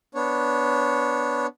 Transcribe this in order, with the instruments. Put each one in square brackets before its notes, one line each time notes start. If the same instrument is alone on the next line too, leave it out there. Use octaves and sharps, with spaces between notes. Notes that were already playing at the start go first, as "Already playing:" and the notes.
[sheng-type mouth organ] B3 D4 C#5